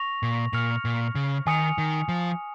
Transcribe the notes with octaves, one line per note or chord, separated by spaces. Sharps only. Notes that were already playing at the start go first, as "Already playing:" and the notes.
Already playing: C#6 A#6 F7
A#2
A#2 F6 C#7 F7
A#2
C#3
D#3 G#5 D#6 C#7 F7
D#3
F3